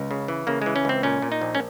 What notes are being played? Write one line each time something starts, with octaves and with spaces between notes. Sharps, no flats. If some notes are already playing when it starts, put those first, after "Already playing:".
Already playing: C#2
C#3
E3
C#3 A#3
E3 G#3
C#4
C#2 C4
A#2 C#4
A#2
D#4
A#1
C#4